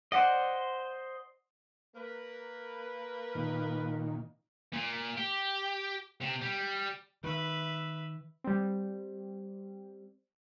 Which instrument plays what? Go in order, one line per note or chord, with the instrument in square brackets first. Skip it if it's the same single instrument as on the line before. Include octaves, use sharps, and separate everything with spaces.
[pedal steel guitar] C5 D#5 [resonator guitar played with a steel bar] D5 F#5
[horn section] A#3 A#4 B4
[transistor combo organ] A#2 D#3
[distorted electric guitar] A#2
G4
C3
G3
[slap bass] D#3 [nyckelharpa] B4 E5
[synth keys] G3 C4